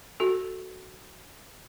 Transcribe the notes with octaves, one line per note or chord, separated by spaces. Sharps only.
F#4 A4